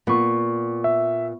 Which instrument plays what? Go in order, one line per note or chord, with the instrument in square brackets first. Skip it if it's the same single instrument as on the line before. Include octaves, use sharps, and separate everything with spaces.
[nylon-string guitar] A#2 [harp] B3 C#6
[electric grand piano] E5